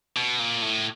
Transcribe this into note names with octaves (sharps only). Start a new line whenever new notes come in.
B2
A#2
A2